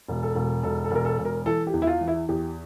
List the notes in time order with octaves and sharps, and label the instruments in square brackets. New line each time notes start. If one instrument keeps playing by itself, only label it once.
[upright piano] E1
A4
E1
E1 A4
A4
E1 A#4
A4
E1
A#4
E3 A4
G4
E2
E4
F4
E3
E4
E2 G4